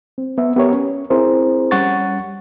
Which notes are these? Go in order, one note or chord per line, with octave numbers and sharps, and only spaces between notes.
C4
B3 E5
B3 G4 A#4 C#5
C#4
C4 E4 G#4 A#4 C5
G3 C#4 F#5 C#6 A6